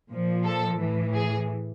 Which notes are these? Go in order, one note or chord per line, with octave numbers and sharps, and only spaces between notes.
A#2 F3
A4
A2 E3
G#4